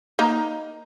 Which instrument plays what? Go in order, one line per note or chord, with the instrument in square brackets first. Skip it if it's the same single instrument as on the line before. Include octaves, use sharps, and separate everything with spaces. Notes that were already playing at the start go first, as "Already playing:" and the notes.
[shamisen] A#3 D#4 A#5